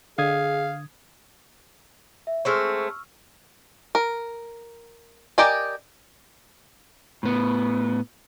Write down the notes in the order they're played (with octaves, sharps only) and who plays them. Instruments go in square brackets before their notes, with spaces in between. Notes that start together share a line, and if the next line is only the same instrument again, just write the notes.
[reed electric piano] D3 D#6 G#6 [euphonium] G#4 [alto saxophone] F5
[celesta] E5
[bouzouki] G#3 A3 C4 [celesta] C#6 E6 F6
[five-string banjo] A#4
G4 A#4 D5 D#5 G#5
[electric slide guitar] A2 B3